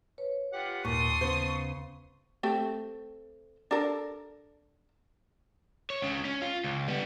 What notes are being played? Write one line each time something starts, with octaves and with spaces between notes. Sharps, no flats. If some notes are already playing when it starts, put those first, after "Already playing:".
B4 C#5
F4 G4 F#5
D#2 A#2 A5 C6 C#6 D#6
C#3 B3 C5
A3 C4 G4
D4 A4 A#4
C#5
C#2 C#3
C#4
F4
C#2
G3 B3